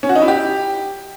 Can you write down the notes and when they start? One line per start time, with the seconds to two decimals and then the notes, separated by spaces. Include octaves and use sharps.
0.03 C#4
0.09 F#4
0.15 D#4
0.22 E4
0.28 G4